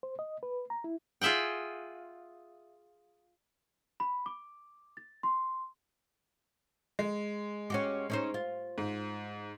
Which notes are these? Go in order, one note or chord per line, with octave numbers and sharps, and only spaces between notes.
C5
D#5
B4
A#5
E4
F4 G#4 E5 F#5 G5
B5
D6
A6
C6
G#3
C#4 F#4 G4
C#4 D#4 C5
F4
G#2